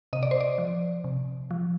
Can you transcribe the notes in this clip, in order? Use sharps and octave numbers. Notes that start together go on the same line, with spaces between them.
C3 D#5
D5
C5
D5
F3
C3
F3